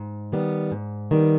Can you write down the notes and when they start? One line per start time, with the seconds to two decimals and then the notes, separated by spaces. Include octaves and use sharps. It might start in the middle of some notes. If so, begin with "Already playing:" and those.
Already playing: G#2
0.32 D#3 G3 B3
0.72 G#2
1.11 D#3 G3 B3